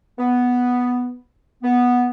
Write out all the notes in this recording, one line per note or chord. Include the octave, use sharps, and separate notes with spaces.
B3
B3